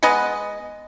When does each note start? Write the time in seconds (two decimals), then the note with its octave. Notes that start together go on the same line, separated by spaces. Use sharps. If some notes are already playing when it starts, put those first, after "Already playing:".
0.03 G#3 B3 B4 D#5